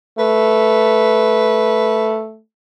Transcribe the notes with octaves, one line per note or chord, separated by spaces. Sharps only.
A3 B4